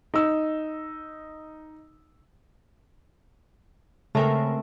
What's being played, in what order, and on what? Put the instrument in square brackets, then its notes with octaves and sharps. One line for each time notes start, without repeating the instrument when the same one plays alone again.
[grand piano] D#4 E6
[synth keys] C#3 G#3 A#4 [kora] A3 C4